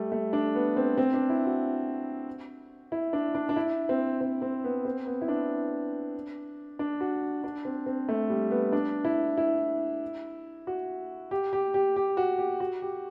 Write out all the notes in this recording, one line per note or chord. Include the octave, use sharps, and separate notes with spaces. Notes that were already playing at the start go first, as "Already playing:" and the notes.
Already playing: G3 A3
A3
D4
B3
C4
C4
D4
E4
F#4
E4
D4
D4
D4
E4
C4
C4
C4
B3
C4
B3
E4
D4
D4
F#4
D4
C4
C4
A3
G3
B3
D4
E4
E4
F#4
G4
G4
G4
G4
F#4
G4
F#4
G4